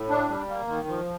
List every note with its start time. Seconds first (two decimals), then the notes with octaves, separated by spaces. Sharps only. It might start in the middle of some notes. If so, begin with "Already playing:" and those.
Already playing: A2
0.10 D4
0.29 G3
0.49 A#3
0.68 D#3
0.88 F3